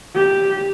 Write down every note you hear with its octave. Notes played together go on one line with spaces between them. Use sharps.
G4